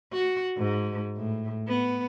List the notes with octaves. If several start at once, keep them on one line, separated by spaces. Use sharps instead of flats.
F#4
G#2
A2
B3